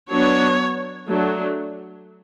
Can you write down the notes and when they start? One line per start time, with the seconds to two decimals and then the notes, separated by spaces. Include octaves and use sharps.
0.10 F#3 B3 D4 C#5
1.08 F#3 A3 D4